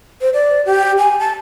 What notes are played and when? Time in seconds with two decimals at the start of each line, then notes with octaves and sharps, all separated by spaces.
0.21 C5
0.34 D5
0.66 G4
0.98 G#5
1.20 A5